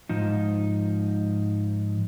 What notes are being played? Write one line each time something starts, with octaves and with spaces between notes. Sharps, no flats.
G#2 F3 D#4